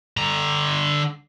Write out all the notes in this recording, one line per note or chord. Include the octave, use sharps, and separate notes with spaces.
D3 A#5